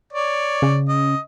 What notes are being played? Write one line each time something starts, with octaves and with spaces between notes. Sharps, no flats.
C#5 D5
C#3
D#5